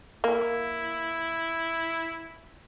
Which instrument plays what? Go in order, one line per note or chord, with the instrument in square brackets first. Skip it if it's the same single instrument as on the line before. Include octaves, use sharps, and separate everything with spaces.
[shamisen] A#3 [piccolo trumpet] E4